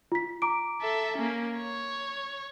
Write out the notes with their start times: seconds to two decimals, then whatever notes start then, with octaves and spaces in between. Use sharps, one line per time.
0.12 F4 B6
0.42 A#5 D6 D7
0.81 A4 E5
1.17 A#3 C#4
1.57 C#5